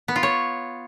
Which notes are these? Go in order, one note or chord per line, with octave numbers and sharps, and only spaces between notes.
B3
F4
C#5